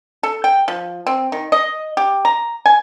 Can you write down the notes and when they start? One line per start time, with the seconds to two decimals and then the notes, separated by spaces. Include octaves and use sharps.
0.23 A4
0.44 G5
0.68 F3
1.07 C4
1.32 D#3
1.52 D#5
1.97 G4
2.25 A#5
2.66 G#5